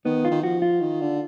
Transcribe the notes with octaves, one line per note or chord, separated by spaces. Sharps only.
D#3 B3
F4
D#3
F3 F#4
F4
D#3
D3